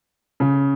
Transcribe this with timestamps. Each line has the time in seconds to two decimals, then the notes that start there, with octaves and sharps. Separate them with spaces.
0.40 C#3